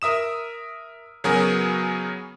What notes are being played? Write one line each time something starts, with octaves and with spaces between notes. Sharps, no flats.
A#4 E5 D#6 E7
C#3 F#3 B3 F#4 G#4 A#4